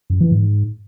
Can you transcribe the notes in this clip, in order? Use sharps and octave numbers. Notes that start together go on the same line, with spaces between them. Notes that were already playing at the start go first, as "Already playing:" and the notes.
F#2
E3
G#2